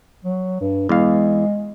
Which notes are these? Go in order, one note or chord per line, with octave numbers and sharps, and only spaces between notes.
F#3
G2
E2 G#3 F5